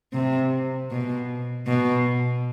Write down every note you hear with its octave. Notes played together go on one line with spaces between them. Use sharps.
C3
B2
B2